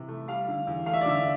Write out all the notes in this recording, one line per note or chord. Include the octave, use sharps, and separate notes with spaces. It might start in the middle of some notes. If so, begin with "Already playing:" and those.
Already playing: C3 E3
A3
G3 F5
D3
E2
A3 F5
E5
D5
D3 E5